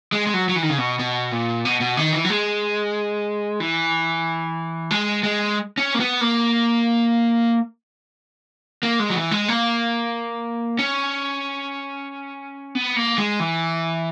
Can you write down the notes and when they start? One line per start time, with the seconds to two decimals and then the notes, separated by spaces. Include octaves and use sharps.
0.12 G#3
0.27 G#3
0.34 F#3
0.49 F#3
0.56 E3
0.63 D#3
0.70 C#3
0.78 B2
0.99 B2
1.31 A#2
1.65 B2
1.81 B2
1.97 D#3
2.13 E3
2.25 F#3
2.30 G#3
3.60 E3
4.91 G#3
5.23 G#3
5.77 C#4
5.94 A#3
6.00 B3
6.21 A#3
8.83 A#3
9.00 G#3
9.10 F#3
9.15 E3
9.31 G#3
9.48 A#3
10.79 C#4
12.75 B3
12.97 A#3
13.18 G#3
13.40 E3